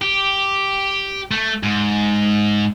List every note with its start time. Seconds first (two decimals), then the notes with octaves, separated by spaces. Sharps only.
0.02 G4
1.31 A3
1.63 G#2